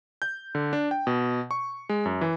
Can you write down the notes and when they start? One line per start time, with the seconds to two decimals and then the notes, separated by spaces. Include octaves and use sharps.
0.22 G6
0.55 D3
0.73 D4
0.91 G5
1.07 B2
1.51 C#6
1.89 G#3
2.05 F#2
2.21 E3